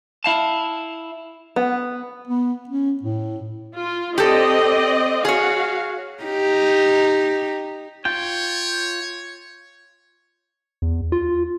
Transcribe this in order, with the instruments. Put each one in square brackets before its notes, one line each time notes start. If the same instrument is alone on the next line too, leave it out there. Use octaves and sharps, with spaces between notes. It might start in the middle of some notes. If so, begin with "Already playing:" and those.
[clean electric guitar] E4 F5 A5
[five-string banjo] B3
[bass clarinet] B3
C#4
A2
[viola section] F4
[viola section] C4 D5 D#5 [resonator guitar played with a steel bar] G4 A4
[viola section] F#4 F5 [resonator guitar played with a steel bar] G#4 C#5
[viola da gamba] D#4 G4
[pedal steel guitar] F4 G5 [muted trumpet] C#5
[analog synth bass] E2
F4